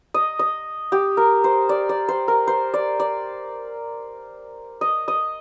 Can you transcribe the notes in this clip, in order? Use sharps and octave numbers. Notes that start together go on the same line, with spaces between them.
D#5
D#5
G4
A#4
C5
D5
D5
C5
A#4
C5
D5
D5
D#5
D#5